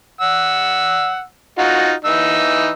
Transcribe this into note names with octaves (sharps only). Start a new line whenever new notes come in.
F#5 E6
D#4 F4 F#4
E3 D#4 E6